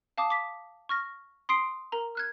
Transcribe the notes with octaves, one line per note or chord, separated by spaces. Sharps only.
F5 A5 D6 D#6
D6 B6
C#6 F6 A#6
C6 D#6 C7 D7
A#4 A#5
F6 F#6 G#6